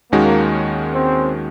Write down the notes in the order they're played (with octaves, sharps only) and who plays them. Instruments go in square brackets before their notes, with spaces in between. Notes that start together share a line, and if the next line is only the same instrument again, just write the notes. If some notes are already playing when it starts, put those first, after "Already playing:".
[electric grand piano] D#2 D#3 G#3 C#4 F#4 [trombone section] A#3
[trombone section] C4